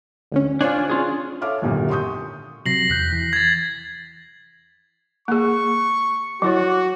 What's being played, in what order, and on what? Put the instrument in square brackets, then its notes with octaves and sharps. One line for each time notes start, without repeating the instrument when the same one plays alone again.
[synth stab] D2 D3 C#4
[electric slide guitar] D4 F4 [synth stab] C5 C#5 G#5
[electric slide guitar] C#4 F4 G#4
[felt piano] A4 C#5 E5 F5 D6 F6
G#1 F#2 A#2 D3 G4
C6 C#6 D#6 G6
[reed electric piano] C3 F#3 [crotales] A#6 C7 F#7
[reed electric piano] E2 F#6 G6 [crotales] B6
[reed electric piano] E3
[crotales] G#6 A6
[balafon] A#3 G#4 [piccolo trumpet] C#6
[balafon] F#3 E4 C#5 [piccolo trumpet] F#4